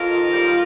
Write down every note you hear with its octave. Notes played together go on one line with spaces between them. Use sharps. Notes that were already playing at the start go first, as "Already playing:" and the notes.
Already playing: F2 F4 A#4
D#3
G3